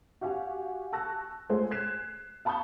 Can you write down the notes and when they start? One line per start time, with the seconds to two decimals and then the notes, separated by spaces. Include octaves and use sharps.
0.21 F#4 G4 F5 F#5 G#5
0.93 A5 C#6 E6 F#6 A#6
1.49 G#3 A3 F4 G#4 C5
1.71 F#6 G#6 B6 C7 E7
2.45 F5 A5 B5 C#6 D#6 G6